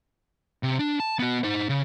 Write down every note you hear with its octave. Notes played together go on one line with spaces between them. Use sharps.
C3
D4
A5
B3 F#4
D#4 C5
C#3